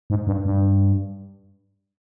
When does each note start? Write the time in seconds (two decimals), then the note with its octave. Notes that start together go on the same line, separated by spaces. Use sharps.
0.10 G#2
0.27 G2
0.45 G2